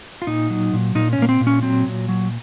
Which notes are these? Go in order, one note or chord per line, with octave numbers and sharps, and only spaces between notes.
F4
A#2 D#4
F#3
A#2
A#2 D#4
C#4
A#2 A#3
C4
A#2
C#4
F#3 C4
A#2
F#3